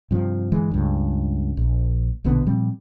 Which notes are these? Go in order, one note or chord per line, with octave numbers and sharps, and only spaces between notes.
G2 C3 F3
G1 E3 G#3
C#2 G2
A#1
A#1 B2 D3 B3
A#2 F3 G3 C4